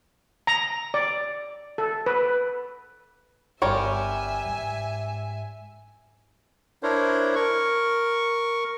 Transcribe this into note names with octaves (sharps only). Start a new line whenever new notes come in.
A#5
D5
A4
B4
G1 G3 A#4 C#5 E5 G#5
G#2
D4 E4 A#4 C5 C#5
A#4 C#6